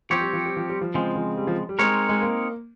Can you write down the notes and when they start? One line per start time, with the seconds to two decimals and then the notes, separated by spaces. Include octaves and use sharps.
0.10 F3 C4 G4 C#5
0.21 G3
0.33 F3
0.46 G3
0.57 F3
0.69 G3
0.81 F3
0.94 C#3 F3 G#3 C4
1.16 F3
1.37 G3
1.47 F3
1.69 G3
1.79 G#3 C4 D#4 A#4 C#5
2.09 G#3
2.22 A#3